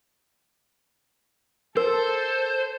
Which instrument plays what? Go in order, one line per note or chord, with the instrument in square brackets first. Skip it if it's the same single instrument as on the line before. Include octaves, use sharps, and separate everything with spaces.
[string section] A4 [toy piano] A#4 [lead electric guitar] C5